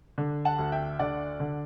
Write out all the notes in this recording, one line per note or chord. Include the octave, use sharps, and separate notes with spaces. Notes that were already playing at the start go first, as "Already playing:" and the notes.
D3
F#5 A5
D2
E5 G5
D3 D5 F#5
D3